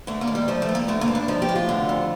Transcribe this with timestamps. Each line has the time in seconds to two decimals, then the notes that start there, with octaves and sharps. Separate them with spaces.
0.07 D3 A3
0.21 A#3
0.27 D#2
0.35 G3
0.48 F3 A3
0.62 A3
0.69 G2
0.75 A#3
0.88 D3 A3
1.01 A#3
1.08 G2
1.15 D4
1.28 F3 D#4
1.42 G4
1.49 A2
1.55 F4
1.69 D3
1.89 F2